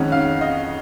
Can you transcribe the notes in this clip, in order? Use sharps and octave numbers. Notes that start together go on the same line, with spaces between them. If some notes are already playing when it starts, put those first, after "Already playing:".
Already playing: F2 D#3 G#3 C#4 F#5
F5
D#5